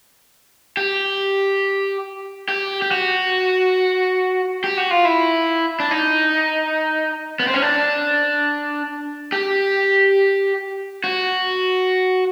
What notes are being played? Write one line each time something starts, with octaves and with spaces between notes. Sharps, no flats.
G4
G4
G4
F#4
G4
F#4
F4
E4
D4
D#4
B3
C4
C#4
D4
G4
F#4